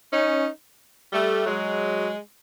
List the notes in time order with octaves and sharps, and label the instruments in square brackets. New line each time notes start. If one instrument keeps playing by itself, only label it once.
[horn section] C#4 D#4
G3 A3
F#3 G#3